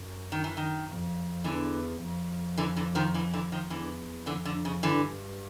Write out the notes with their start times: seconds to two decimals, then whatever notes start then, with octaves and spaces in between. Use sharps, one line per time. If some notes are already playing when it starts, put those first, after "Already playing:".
Already playing: F#2
0.32 D#3
0.44 E3
0.57 D#3
0.88 F2
1.44 E2 D3 E3
2.02 F2
2.57 D3 E3
2.76 D3 E3
2.95 D#3 F3
3.14 D3 E3
3.33 D3 E3
3.52 D#3 F3
3.70 E2 D3 E3
4.26 F2 D3 E3
4.45 D3
4.65 C#3
4.83 G2 D3 E3